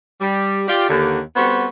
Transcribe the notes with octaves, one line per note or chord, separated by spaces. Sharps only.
G3
F4 G4 D5
D#2 D3
G3 B3 C4 F#4 A4 C5